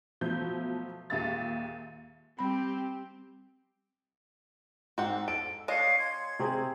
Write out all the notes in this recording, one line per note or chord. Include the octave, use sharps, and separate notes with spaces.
B2 F3 F#3 A3 G6
D#2 A#2 G#3 E5 F5 A6
G3 C4 G4 B5
G#2 C4 F#5
A4 D7
G#3 D4 C#5 D#5 F5
C6 G#6
C3 C4 G#4